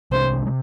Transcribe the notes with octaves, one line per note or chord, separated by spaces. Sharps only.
C2 C3 G#3 D4 C5
C3 G#3